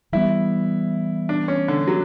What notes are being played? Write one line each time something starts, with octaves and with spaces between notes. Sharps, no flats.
E3 G3 B3 E4
D4
C#4
D3
F#3